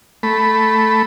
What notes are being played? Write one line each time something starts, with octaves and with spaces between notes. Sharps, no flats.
A3 B5